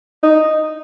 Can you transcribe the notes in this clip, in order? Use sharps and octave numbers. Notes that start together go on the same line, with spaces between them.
D#4